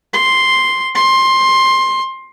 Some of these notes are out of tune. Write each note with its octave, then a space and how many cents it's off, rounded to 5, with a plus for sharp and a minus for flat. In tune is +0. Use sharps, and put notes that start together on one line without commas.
C6 +0
C6 +15